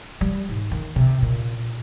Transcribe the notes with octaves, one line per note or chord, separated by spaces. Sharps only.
G3
G#2
D#3
C3
A#2